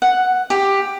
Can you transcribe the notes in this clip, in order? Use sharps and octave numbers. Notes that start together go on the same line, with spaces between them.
F#5
G4